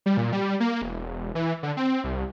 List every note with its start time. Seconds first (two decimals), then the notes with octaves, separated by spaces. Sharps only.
0.06 G3
0.17 A#2
0.32 G3
0.60 A#3
0.82 E1
1.35 E3
1.63 D3
1.77 C4
2.04 C2